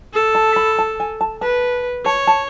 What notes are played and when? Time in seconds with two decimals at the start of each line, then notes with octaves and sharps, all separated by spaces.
0.14 A4
0.35 A5
0.56 B5
0.79 A5
1.00 G#5
1.21 A5
1.41 B4 A5
2.05 C#5 A5
2.27 A5